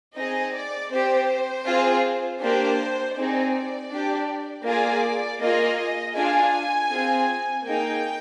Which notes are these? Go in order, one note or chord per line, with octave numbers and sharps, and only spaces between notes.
C4 D#4 G#4 D#5
D5
C4 G4 C5
C4 F4 G#4
A#3 D4 G4 C5
C4 D#4 G#4 D5
D4 G4
A#3 F4 G#4 D5
A#3 F4 G#4 D#5
D4 F4 G#4 G#5
C4 F4 G#4
A#3 D#4 G#4 G5